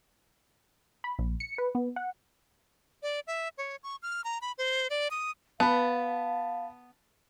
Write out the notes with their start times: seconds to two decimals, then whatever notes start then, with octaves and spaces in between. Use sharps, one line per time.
1.04 B5
1.19 A#1
1.40 C#7
1.58 B4
1.75 B3
1.96 F#5
3.03 D5
3.27 E5
3.58 C#5
3.83 C#6
4.03 F6
4.24 A#5
4.42 B5
4.58 C5
4.90 D5
5.11 D#6
5.60 B3 F5 A5 B5